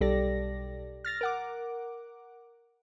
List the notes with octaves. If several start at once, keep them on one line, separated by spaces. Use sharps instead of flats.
B1 G3 G4 A4 D5 A#6
F6 A6 A#6
A#4 F#5 D6